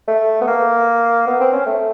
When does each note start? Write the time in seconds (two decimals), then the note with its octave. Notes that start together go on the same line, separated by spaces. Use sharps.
0.08 A3
0.41 B3
0.48 A#3
1.27 B3
1.40 C4
1.53 C#4
1.66 A3